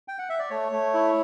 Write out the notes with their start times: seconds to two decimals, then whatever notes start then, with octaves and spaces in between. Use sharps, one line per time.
0.08 G5
0.19 F#5
0.30 E5
0.39 D5
0.50 A3 C#5
0.72 A3
0.94 E4